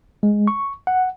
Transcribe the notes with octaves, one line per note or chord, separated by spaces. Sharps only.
G#3
C#6
F#5